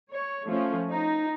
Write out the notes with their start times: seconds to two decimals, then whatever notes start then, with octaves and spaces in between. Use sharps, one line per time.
0.12 C#5
0.47 F3 A3 C#4
0.89 D#4